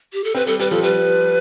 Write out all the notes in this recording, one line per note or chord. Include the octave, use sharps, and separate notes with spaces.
G4
A4
C4 B4
G3 A4
G3 B4
F3 A4
G3 B4